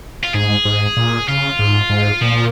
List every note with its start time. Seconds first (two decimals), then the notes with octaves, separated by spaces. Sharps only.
0.23 F4
0.34 G#2 G#4
0.65 G#2
0.97 A#2
1.28 C#3 F4
1.59 G#2
1.90 G#2
2.21 A#2 F3